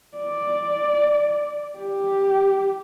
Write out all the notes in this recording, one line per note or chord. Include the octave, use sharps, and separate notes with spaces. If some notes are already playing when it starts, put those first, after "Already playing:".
D5
G4